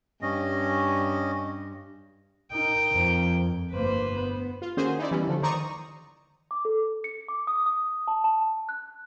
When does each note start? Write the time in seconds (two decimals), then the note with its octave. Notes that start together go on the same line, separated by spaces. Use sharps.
0.22 G2 C#4 D#5
2.52 D#4 A#4 G5
2.92 F2
3.72 G1 A#3 B4 C5
4.13 B3
4.62 F4
4.77 D#3 A#3 C#4 F#4 G#4 C5
4.99 D#4 E4 D5
5.11 E3 G3 B3 C#4 E4
5.27 D3 F3 A3
5.42 D#3 C5 D5 A#5 C#6 D#6
6.51 D6
6.65 A4
7.04 C#7
7.28 D6
7.47 D#6
7.66 D#6
8.07 A5
8.24 A5
8.69 F#6